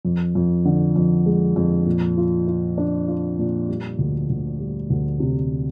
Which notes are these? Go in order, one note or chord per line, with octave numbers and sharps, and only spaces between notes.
F2
F2
D3
F2
G#3
F2
A#2
F4
F4
D4
F4
A#2
G3
D2
D2
G3
D2
C3